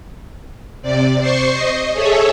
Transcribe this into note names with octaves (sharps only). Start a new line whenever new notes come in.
C3 D5
C5 C6 C#6
D#5
G#4 A4 C#5 E5